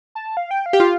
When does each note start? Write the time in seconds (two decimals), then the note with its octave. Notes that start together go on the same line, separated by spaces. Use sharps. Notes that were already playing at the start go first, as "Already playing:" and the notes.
0.15 A5
0.37 F5
0.51 G5
0.66 F5
0.73 G4
0.80 F4